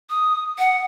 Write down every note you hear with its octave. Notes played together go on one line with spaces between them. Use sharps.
D#6
F#5